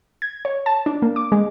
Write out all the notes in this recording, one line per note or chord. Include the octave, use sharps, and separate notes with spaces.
G#6
C#5
A5
D4
A#3
D6
G#3